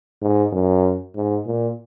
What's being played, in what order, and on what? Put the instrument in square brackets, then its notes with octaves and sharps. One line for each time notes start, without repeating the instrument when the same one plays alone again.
[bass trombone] G#2
F#2
G#2
A#2